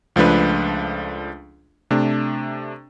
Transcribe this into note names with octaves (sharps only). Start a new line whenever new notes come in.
C#2 F3 A3 D4 B4
C3 A3 D4